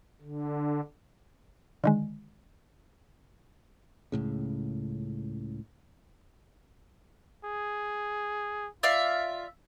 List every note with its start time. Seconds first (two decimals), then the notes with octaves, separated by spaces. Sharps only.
0.21 D3
1.84 D3 D#3 G#3
4.12 C#2 A2 C#3
7.45 G#4
8.83 F4 D5 E5 F5